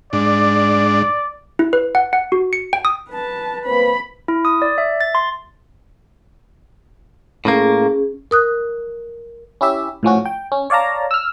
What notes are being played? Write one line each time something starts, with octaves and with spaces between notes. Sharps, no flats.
G#2 D4 D5
E4
B4
F#5
F#5
F#4
C#7
G5
D#6
B4 A5
A#3 C4 B4 B5
E4
D#6
D5
E5
A6
C6
A2 A#3 C#4 G#4
A#4 D#6 F#6
C#4 E4 G4 E5
A2 F3 C#4 F#4
G5
C#4
C#5 D5 F5 A5 A#5
E6 F6